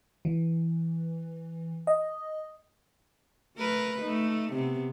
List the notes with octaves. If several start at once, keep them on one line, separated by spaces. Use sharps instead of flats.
E3
D#5
A3 A#4 B4
A3 D#4
C3 B3